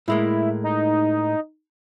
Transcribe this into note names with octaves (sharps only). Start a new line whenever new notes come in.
A2 G#3 A#3 E4
D#4